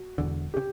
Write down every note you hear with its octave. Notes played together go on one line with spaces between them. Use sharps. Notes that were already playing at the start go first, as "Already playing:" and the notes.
Already playing: F#4
E1 E2 D3
C#3 G4